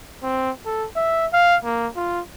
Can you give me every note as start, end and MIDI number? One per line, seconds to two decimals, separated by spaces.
0.23 0.51 60
0.66 0.86 69
0.96 1.27 76
1.33 1.57 77
1.64 1.87 58
1.96 2.21 65